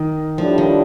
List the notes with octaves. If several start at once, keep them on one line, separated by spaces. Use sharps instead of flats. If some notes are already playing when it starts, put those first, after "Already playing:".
Already playing: D#3
A2 F3 G3 D4 F4
D#3